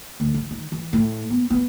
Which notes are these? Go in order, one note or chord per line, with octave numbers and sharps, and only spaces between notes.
D2
E3
D#3
E3
A2
B3
B3